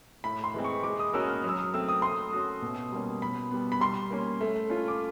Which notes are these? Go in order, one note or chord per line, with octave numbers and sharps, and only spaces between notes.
A2 B5
C6
E3 G#3 C4
C#6
G#3 D6
D#6
C#4 F#4 A#4 E6
F6
F#3 E6
D#6
A3 C4 E6
D#6
A3 C6
C#4 F#4
B2
G3 A#3 C#4
B2 B5
G3 B3
B5
G3 C6
A#3 C#4
A3
C#4 F4
D6